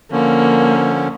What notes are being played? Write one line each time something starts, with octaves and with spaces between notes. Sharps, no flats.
D3 F3 A#3 C#4